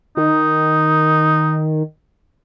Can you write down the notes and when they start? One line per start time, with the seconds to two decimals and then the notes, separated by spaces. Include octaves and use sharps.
0.17 D#3 D#4